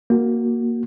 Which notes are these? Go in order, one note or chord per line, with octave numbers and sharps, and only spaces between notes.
A#3 F#4